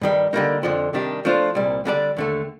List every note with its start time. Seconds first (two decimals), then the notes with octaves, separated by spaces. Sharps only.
0.01 G2 D#3 G3
0.33 D3 G3 A#3 D#4
0.63 F2 D3 F3
0.93 C3 D#3 G3 D4 G4
1.25 F3 A3 D4 F4 C5
1.55 C2 A#2 G3
1.85 D3 G3 D4 A4 D5
2.17 D#2 D3 A3